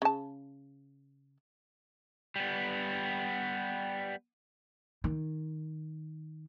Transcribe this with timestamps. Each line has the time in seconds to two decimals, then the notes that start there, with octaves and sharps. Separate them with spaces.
0.02 C#3 A5
2.36 G3 B3
5.04 D#3